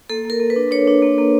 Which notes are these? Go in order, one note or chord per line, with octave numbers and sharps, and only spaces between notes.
A#3 A4
A#3 A#4
A#3
B4
D4
D4 C#5
D4
A#3
A#3